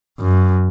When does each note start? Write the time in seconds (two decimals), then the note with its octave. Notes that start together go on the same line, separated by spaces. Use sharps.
0.20 F#2